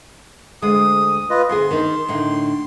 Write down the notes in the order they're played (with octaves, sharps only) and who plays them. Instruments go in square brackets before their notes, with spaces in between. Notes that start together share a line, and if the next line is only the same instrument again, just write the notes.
[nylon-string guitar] D2 G#3 [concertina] D#6
[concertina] F4 B4 D#5
[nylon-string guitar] D2 G#4 [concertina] C6
[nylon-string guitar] D#3 D#4
A2 D3 D#4